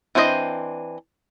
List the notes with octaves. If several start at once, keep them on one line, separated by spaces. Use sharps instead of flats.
E3 C4 D4 C5 D#5